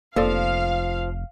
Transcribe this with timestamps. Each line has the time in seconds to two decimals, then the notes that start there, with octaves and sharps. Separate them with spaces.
0.16 F1 F3 A#3 A4 D5 F5